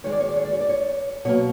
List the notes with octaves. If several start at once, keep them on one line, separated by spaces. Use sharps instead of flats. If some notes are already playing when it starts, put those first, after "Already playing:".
D#3 G#3 C#5
D5
C#5
D5
C#5
D5
C#5
D5
C#5
B2 F#3 A#3 C#5